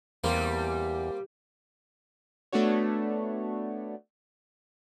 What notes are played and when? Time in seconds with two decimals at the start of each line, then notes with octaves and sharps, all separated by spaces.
0.24 E2 G3 A#3 C4
2.53 A3 B3 D4 F#4 C#5